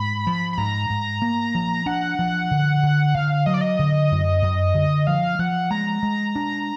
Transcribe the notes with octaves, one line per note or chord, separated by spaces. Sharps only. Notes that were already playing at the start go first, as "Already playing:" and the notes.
Already playing: G#2 B5
F3
B5
G#2 A#5
G#2
A#3
F3
D4 F#5
F3
D3
D3
D3 F5
F#3 D#5
D5
D#5
D3
F#2
F#2
D3
F3 F5
F3 F#5
G#3 A#5
G#3
D4